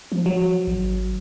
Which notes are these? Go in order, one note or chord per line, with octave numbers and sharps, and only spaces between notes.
F3
F#3
G#1